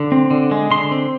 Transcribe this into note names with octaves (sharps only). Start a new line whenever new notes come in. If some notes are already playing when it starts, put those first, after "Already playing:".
Already playing: D3
C4
D3
G#3
D3 C6
C4